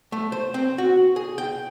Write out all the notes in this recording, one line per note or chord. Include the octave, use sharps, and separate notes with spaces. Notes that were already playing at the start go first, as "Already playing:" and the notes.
A3
C5
C4
F#4
G#4
G5